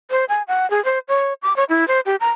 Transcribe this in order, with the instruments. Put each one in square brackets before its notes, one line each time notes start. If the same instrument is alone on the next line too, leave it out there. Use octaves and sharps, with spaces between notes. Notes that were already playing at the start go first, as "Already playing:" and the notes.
[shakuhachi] C5
G#5
F#5
G#4
C5
C#5
D6
C#5
E4
C5
G4
A#5